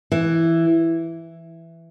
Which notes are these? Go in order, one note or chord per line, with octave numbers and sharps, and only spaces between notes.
E3